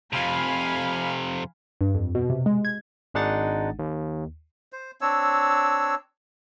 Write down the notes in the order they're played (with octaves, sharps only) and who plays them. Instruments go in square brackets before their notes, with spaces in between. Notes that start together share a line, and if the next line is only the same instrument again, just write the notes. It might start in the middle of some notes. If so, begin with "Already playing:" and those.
[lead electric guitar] F2 C3 [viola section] F5 G#5 B5
[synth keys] G2
F2
B2
C3
G#3
G#6
[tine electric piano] G#1 G#3 D4 D#4 F#5 A6
D#2
[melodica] C5
C4 D4 C#5 E6